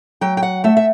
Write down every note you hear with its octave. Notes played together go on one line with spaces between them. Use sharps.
F#3 G5
G5
F#5
A3 E5
E5